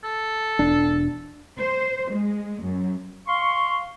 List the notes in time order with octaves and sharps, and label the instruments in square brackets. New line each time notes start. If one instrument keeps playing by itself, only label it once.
[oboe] A4
[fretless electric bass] E1 D4
[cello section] C5
G#3
F#2
[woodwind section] F5 C6 C#6